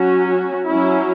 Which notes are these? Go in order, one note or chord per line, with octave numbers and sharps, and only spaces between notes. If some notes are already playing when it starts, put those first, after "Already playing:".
Already playing: F#3 C#4 F#4
F#4
F#3 C#4 E4